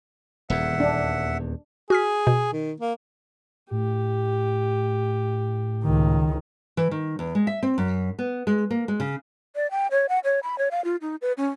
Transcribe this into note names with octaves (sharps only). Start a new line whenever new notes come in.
D#1 E2 E5 F#5
D4
F#4 G#4 F6 B6
B2
D#3
A#3
A2 G4
C#2 D#3
E3
D#3
E2
G#3
E5
C4
F#2
B3
G#3
A#3
G#3
C#3
D5
G5
C#5
F#5
C#5
B5
C#5
F5
F4
D#4
B4
C#4